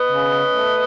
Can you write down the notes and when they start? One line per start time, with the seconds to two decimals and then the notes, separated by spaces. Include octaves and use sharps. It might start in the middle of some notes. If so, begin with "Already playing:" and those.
Already playing: B4 D#5
0.09 C#3
0.30 C#4
0.52 A3